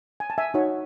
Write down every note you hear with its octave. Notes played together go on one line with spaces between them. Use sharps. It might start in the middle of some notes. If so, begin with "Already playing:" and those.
G#5
A5
E5 G#5
D#4 F#4 C#5